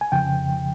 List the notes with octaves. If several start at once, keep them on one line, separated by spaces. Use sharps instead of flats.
G#5
F2 C#3 F3 G5